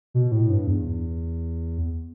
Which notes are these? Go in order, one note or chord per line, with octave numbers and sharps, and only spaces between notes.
B2
A2
G2
E2